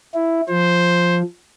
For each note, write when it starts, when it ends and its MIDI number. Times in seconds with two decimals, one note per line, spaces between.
0.14 0.41 64
0.49 1.23 53
0.49 1.19 72